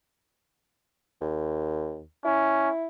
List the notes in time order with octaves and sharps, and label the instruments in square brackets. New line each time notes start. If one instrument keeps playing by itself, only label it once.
[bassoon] D#2
[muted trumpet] C#4 [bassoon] E4